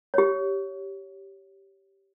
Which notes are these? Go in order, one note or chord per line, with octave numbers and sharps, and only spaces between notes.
G4 C#5